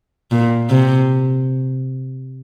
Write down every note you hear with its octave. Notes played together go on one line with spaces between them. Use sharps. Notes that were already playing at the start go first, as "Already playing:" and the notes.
A#2
C3